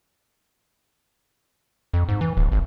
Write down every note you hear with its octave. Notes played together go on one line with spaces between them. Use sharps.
F2
G#2
E3
D1
G#1